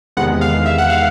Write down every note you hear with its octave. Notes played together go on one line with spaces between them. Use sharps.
E2 C3 D#3 G#3 B3 F#5
F5
E5
F#5
F5